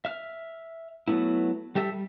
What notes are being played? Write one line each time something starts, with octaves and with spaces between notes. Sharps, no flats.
E5 F6
F#3 A3 B3 E4
G3 G4 A4 E5
G3